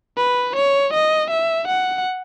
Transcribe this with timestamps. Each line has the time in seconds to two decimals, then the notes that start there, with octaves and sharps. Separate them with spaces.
0.17 B4
0.56 C#5
0.93 D#5
1.31 E5
1.68 F#5